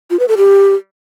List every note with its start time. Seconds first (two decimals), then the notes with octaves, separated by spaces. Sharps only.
0.11 F4
0.19 B4
0.28 A4
0.37 G4